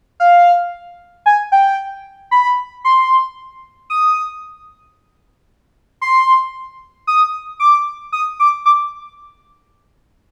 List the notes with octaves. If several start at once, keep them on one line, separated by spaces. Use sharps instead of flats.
F5
G#5
G5
B5
C6
D#6
C6
D#6
D6
D#6
D6
D6